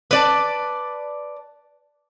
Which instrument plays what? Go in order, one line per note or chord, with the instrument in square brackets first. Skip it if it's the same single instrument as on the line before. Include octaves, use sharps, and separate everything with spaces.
[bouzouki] B4 D5 A5